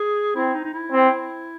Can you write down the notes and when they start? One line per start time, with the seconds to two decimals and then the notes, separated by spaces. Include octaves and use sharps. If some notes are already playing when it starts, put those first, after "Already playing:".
Already playing: G#4
0.36 C4 E4
0.55 D#4
0.65 D#4
0.74 E4
0.92 C4